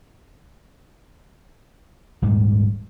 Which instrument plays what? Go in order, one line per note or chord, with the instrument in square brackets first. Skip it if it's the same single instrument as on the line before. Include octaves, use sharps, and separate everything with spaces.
[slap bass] D#1 G#2 G3